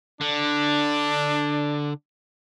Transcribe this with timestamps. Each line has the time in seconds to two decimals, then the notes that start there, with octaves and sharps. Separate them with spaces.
0.21 D3 D4